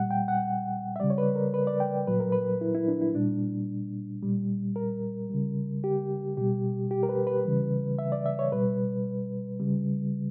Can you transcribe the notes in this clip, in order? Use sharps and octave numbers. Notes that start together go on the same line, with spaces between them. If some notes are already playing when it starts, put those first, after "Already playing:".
Already playing: A#2 G3 F#5
G5
F#5
E5
C#3 G3 D5
C#5
B4
A#4
B4
D5
G5
A#2 F#3 B4
A#4
B4
E4
E4
D4
E4
A#2 G3 D4
A#2 G3
A#4
C#3 G3
G4
B2 G3 G4
G4
A#4
B4
B4
C#3 E3 G3
E5
D5
E5
C#5
B2 G3 B4
C#3 G3